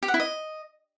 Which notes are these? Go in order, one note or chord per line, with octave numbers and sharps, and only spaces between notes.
G4
F#5
E4
D#5